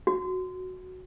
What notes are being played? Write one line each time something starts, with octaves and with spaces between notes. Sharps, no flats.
F#4